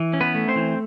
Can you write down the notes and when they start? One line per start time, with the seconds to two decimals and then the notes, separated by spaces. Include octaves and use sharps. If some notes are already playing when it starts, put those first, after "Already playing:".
Already playing: E3
0.13 C#4
0.21 B3 B4
0.35 A3
0.48 C4 C5
0.56 E3